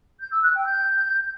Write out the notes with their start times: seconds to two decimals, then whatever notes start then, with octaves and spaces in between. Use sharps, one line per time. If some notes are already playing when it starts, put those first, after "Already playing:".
0.21 G6
0.32 E6
0.43 F#6
0.54 G5
0.66 G6